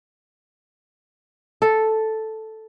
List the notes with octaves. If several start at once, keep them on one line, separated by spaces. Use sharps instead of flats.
A4